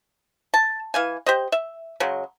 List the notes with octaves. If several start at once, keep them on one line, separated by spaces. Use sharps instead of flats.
A5
E3 F5 G#5
G4 C5 D#5
E5
C#3 F#3 G#3